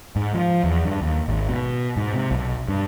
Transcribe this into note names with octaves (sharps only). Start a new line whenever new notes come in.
G#2
F3
E2
G2
D#2
G#1
B2
G#2
C3
B1
G2